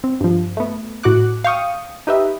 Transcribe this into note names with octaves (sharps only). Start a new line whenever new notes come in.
C4
G2 F3
A3 B3
A2 F#4 F#5 D6 F#6
F5 G5 C#6 D#6
D#4 G4 B4 D#5 E5